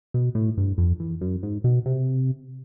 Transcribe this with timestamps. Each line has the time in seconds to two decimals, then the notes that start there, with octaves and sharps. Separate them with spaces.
0.14 B2
0.35 A2
0.58 G2
0.78 F2
1.00 E2
1.21 F#2
1.43 G#2
1.64 B2
1.86 C3